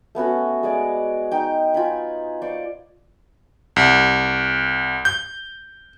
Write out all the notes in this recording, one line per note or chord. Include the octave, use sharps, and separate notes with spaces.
A3 B3 C#4 F#4
G#3 D5 G#5
D#4 G5
F4 G#5 B5
C5 D5 C#6
C2
G6